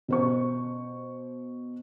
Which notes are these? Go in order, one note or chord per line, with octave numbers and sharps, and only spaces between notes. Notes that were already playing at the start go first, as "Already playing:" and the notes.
B2 C5 C#6